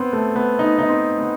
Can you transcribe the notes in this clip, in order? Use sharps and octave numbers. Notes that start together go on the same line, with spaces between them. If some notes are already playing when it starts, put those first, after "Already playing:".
Already playing: B3 C4
A3
B3
D#4
D#4
C4
B3